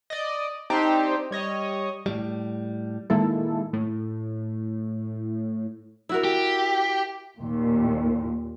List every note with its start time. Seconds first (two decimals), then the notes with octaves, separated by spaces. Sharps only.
0.10 D5 D#5
0.70 C4 D4 D#4 G4 C5
1.31 G3 C#5 D#5
2.06 A2 G3
3.10 A#2 D#3 G#3 A#3 E4 A4
3.73 A2
6.09 E4 F#4 A#4
6.24 G4
7.39 D#2 A#2